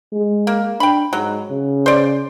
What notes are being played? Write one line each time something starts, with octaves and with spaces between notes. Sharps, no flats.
G#3
A#3
D4 G5 B5
G#2 F#3
C#3
C5 D5